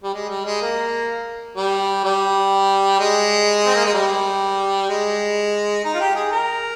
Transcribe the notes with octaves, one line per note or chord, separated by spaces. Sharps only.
G3
G#3
G3
G#3
A#3
G3
G3
G#3
C4
A#3
G#3
G3
G#3
D#4
F4
G4
G#4
A#4